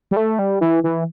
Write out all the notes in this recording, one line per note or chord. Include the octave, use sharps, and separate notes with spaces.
G3
A3
G3
E3
E3